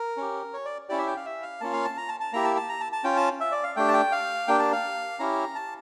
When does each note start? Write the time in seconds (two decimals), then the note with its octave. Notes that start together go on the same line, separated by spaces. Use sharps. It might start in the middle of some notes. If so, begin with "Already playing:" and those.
Already playing: A#4
0.17 C#4 G4
0.53 C#5
0.65 D5
0.89 C#4 E4 G4 D5
0.98 E5
1.07 G5
1.17 F5
1.26 E5
1.42 F5
1.61 A#3 C#4 F4 A5
1.73 F5
1.85 A5
1.97 A#5
2.08 A5
2.20 A5
2.33 A#3 E4 G4 A#5
2.44 A5
2.56 A5
2.69 A#5
2.81 A5
2.92 A5
3.04 C#4 F4 G5
3.16 A5
3.40 E5
3.52 D5
3.64 F5
3.76 A3 D4 G4 G5
3.88 A5
3.94 G5
4.12 F5
4.48 A#3 D4 G4 G5
4.59 A5
4.72 F5
5.19 C#4 E4 G4 A#5
5.55 A5